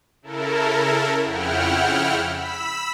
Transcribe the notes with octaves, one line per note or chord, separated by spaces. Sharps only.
C#3 E4 A4 A#4
F2 C#3 E4 F#5 G5 F6
B5 E6 B6